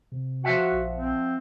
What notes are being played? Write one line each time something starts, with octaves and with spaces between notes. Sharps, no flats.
C3
F3 F#4 E5 F#5
A#1
C4